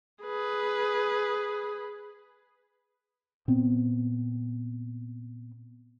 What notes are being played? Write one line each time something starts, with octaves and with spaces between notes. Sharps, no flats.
G#4 B4
A#2 B3 C4